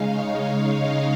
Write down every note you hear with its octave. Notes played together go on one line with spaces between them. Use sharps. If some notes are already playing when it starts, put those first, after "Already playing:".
Already playing: C#3 G#3 D#4 F5
C#5
F5
D#5